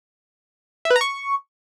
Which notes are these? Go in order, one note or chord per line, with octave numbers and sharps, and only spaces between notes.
E5
B4
A#5
C#6